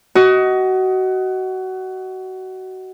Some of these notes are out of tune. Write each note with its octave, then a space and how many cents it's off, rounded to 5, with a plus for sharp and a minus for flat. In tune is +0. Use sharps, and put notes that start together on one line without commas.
F#4 +20 D#5 +15